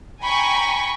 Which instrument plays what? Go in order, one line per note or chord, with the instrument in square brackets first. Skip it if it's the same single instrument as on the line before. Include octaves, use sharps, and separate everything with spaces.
[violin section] G5 G#5 A#5 B5 C#6